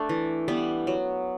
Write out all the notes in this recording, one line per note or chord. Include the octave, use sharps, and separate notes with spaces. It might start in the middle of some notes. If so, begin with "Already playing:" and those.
Already playing: A3 D4
E3
G3 B3
F#3